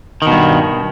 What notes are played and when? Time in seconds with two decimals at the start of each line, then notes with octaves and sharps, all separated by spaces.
0.22 D#3
0.27 B2
0.32 G2